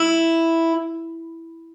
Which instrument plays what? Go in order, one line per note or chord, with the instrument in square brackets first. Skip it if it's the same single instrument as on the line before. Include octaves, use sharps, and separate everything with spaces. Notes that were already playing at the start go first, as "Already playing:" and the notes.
Already playing: [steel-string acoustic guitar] E4